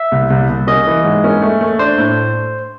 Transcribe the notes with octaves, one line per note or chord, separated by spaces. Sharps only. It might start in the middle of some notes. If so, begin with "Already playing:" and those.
Already playing: E5
C2
C2
C2
C#4 D#5
E3
G#2
C#4
A3
A3
D4 C5
A2